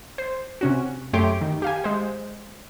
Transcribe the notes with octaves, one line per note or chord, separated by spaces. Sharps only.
C5
C3 C#4 F#4
F#2 A3 G4 C#5 C6 D6
D#3
G4 F5 G#5
G#3 C5